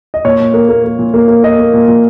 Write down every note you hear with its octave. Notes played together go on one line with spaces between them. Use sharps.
D#5
A#2 C#5
A#2
A#3
A#3
A#3
A#2
A#3
A#3
A#3 D#5
A#3
A#2
A#2